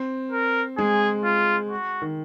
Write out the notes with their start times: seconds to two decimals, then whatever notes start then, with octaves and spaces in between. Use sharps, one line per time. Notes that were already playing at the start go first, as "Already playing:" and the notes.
Already playing: C4
0.32 A#4
0.77 G#3 G#4
1.24 F4
1.71 F#4
2.02 D#3